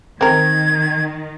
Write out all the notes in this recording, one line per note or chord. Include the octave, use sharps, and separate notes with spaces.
D#3 C4 A#4 G#6